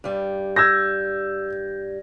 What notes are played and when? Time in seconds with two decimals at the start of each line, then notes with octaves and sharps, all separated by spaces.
0.04 G2 G3
0.56 E6 G6 G#6 A#6